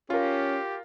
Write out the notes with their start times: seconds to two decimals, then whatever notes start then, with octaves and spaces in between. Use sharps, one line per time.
0.10 C#4 F4 G4 A#4